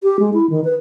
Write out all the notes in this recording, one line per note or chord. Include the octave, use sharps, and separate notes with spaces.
G4
G#3
E4
D#3
B4